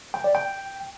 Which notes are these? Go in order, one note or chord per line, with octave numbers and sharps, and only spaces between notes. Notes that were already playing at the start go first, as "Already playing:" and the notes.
G5
D5
G5